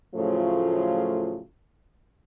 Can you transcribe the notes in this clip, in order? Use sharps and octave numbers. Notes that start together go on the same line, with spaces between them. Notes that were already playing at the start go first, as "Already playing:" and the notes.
A2 C#3 F3 F#3 A3 F4